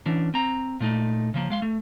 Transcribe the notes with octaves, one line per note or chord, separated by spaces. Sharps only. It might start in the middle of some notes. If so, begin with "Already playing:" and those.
E3 C#4 D4
C4 A#5
A#2 A3 D#4
C#3 F3 A#3
G#3 F5 C6
A3